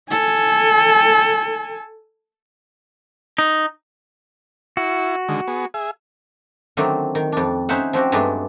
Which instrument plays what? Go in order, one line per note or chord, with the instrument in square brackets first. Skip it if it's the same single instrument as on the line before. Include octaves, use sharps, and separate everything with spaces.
[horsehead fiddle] A4 G#5
[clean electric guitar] D#4
[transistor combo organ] E4 [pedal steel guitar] F#4
[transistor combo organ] D3 D#3 G#3
B3 G#4
G#4 E5
[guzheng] D3 D#3 F#3 A3 C4 D4
D#3
F2 D4
C#4 D#4 C5 E5 F#5
F3 C4 F#4 G4
G2 F#3 G#3 A3 B3 D4